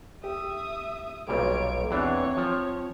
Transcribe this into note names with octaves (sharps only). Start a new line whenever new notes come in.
G4 E5 D#6
B1 A#2 G3 C#5 D7
E2 E3 C4 D4 C#5
F3